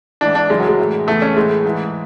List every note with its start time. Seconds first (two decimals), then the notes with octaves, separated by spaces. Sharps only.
0.21 G#2 E3 D4
0.35 D4
0.50 F#2 C#3 E3 G#3
0.60 F#3
0.68 G#3
0.79 A2 E3
1.07 E2 C#3 E3 A3
1.22 C#4
1.36 A2 E3 G#3
1.64 G#2 E3